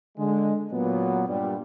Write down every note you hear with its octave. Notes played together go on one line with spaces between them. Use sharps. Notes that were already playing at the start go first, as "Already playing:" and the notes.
D3 G#3
A#2 F#3 B3
G2 A#2 G3